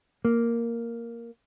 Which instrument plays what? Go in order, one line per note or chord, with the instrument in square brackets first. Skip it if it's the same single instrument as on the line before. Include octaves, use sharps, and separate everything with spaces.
[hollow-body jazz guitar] A#3